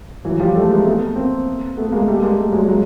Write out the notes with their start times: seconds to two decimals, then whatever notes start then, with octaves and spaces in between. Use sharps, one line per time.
0.25 E3 F#3
0.40 F3 G3
0.55 G3 A3
0.70 G#3 A#3
0.85 A3 B3
1.15 A#3 C4
1.77 A3 B3
1.92 G#3 A#3
2.08 G3 A3
2.22 G#3 A#3
2.38 G3 A3
2.53 F#3 G#3
2.68 F#3 G#3